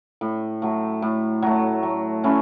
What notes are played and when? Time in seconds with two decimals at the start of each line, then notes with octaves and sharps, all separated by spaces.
0.21 A2
0.62 F#3 A3
1.02 A2
1.42 F#3 A3
1.83 F#3
2.24 A3 C#4 E4